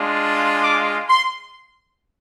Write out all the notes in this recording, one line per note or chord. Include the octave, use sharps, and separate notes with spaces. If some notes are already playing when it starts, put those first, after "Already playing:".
Already playing: G#3 D4 F4
D6
C6